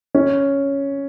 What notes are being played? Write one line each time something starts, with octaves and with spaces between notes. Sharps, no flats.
C#4